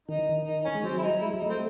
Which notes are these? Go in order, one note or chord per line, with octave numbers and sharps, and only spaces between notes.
D#3 D#4
D#3
D#4
D#4
C#4
G#3
F#3 C4
E4
D#4
G#3 E4
F#3
D#4
A3 C4